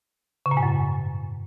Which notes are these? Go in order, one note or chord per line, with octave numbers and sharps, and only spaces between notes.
C#3
A#2
G#2
F#2